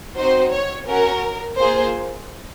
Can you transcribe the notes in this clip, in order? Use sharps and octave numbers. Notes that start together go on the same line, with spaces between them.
C4 D#4 F#4 C5
C#5
C#4 F#4 A#4
A#3 F4 G#4 C5